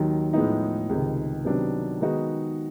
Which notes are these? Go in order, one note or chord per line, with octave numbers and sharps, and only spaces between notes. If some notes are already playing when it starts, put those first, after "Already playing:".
Already playing: D#2 D#3 F#3
A2 F3 G#3 B3 D#4
C#2 C3 D#3
C3 D#3 F#3 B3 D4
D#3 G#3 B3 D#4 F#4